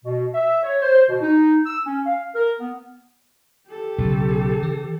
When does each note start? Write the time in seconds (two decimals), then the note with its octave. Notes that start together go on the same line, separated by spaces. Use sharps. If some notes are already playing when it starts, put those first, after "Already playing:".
0.03 B2
0.33 E5
0.63 C#5
0.80 C5
1.08 B2
1.20 D#4
1.65 E6
1.85 C#4
2.05 F5
2.34 A#4
2.59 B3
3.69 G4 A4
3.98 B1 C#3
4.62 E3